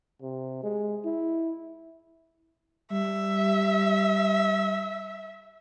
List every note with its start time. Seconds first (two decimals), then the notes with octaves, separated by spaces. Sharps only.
0.22 C3
0.64 G#3
1.05 E4
2.92 G3 E5